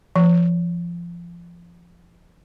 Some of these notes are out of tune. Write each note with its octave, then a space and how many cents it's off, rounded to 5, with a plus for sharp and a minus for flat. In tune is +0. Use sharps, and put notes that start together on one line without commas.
F3 -25